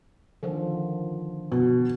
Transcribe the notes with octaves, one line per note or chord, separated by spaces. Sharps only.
D3 D#3 F3
B2